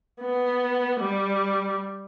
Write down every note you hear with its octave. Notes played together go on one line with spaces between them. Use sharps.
B3
G3